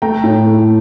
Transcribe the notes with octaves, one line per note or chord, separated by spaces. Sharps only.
A3 G5 A#5
A2
A3